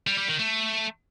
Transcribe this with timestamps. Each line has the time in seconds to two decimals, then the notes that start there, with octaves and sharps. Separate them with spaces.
0.07 G3
0.18 G3
0.29 D#3
0.39 A3